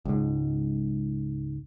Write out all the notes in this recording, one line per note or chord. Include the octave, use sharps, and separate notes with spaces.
C#2 G#2